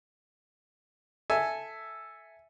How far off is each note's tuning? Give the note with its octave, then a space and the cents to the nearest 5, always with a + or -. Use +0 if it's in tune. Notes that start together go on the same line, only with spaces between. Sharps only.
A4 +0 E5 +0 G#5 +0